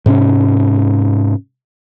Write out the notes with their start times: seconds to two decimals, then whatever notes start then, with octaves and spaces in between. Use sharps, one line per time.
0.06 G#2 C3 C#4